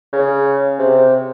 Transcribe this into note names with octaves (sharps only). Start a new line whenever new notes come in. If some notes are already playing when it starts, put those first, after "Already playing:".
C#3
C3